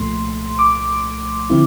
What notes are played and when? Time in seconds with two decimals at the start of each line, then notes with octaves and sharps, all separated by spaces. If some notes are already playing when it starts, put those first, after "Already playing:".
Already playing: C2 A#2 F3 A3 C6
0.59 D6
1.50 D3 F3 C4 E4